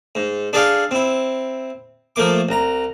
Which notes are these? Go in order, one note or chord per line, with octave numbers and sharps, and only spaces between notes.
G#2
D4 G#4 A4 D5 F5 G5
C4 E4
F3 A3 A#3 D6
C2 A#5